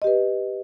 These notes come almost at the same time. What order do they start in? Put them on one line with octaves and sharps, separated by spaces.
D#5 G4 B4